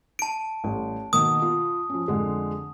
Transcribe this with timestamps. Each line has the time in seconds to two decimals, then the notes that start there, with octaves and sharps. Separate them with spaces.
0.19 A5 D7
0.64 A1 G3
1.13 B2 D#3 A#3 D#6
1.42 F4
1.90 F3 C#4
2.08 F2 D3 G#3